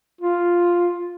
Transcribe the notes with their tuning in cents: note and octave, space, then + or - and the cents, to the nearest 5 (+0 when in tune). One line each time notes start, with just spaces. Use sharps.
F4 +0